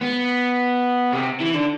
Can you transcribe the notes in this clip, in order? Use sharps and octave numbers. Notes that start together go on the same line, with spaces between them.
B3
C3
E3
D3